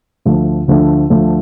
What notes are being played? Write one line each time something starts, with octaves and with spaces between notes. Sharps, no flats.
D2 D3 F3 A3
D2 D3 F3 A3
D2 D3 F3 A3